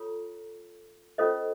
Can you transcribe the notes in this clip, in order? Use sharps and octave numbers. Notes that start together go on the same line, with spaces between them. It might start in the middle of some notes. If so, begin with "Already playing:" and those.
Already playing: F4 A4 C#5 A#5
C#4 F4 A4 C5 D#5